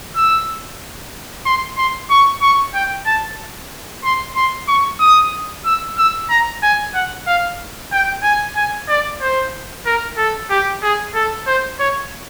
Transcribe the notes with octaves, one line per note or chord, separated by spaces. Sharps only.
E6
C6
C6
C#6
C#6
G5
A5
C6
C6
C#6
D#6
E6
E6
A#5
G#5
F#5
F5
G5
G#5
G#5
D5
C5
A#4
A4
G4
G#4
A4
C5
C#5